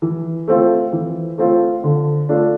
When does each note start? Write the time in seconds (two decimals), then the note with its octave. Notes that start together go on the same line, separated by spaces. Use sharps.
0.02 E3
0.48 A3 C4 F4
0.93 E3
1.38 A3 C4 F4
1.84 D3
2.29 A3 D4 F4